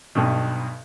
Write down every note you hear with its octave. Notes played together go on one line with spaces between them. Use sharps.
B1 G2 B2